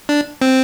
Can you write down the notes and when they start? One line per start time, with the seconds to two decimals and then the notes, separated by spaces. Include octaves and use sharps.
0.09 D4
0.42 C4